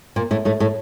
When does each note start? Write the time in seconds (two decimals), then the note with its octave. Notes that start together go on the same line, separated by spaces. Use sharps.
0.16 A#2 A#3
0.31 A2 A3
0.45 A2 A3
0.60 A2 A3